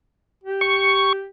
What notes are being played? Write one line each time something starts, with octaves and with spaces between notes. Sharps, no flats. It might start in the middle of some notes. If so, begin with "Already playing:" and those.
G4
C#6